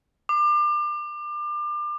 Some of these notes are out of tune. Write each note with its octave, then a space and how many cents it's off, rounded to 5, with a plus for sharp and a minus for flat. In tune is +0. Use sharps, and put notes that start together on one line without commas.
D6 +30